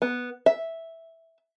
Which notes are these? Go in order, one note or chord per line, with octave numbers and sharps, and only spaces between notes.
B3
E5